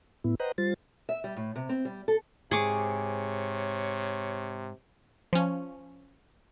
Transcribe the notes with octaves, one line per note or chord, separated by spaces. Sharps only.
A2 B3 E4
B4 C5 D#5 F#5 G5 A#5
G3 F4 C5 A6
E5
G3
A2
C3
C4
G3
A4
G#2 C3 G#4 C#5 C#6 D6
F3 C#4